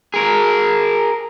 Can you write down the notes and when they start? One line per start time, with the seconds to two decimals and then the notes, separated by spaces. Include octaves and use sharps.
0.14 G#4 A#4